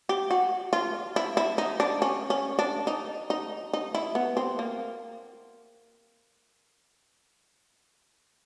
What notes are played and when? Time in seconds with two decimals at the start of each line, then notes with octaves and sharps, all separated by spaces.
0.09 G4
0.31 F#4
0.73 F4
1.16 E4
1.37 E4
1.58 D#4
1.80 D4
2.02 C#4
2.30 C#4
2.59 D4
2.87 D#4
3.30 D#4
3.73 D#4
3.95 E4
4.15 B3
4.37 C4
4.59 A#3